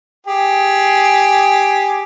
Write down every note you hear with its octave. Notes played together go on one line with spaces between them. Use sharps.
G4 G#4